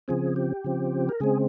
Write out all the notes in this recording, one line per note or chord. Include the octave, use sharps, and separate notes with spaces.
C#3 F3 C4 G#4
G4
C#3 F3 C4
A#4
C#3 G#3 C4 G#4